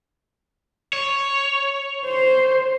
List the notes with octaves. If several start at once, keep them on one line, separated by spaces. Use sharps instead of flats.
C#5
C5